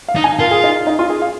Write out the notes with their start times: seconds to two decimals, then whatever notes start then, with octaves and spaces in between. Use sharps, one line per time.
0.08 F5
0.16 D#4
0.24 G#5
0.39 F4 A#4
0.51 G#4
0.64 D#4
0.87 D#4
0.99 F4
1.10 G#4
1.22 F5